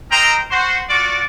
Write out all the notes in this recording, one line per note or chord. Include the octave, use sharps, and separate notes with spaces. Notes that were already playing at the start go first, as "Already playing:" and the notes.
C4 A#4 C5 D#5 G5 A#5
F#4 C5
F4 F#4 D5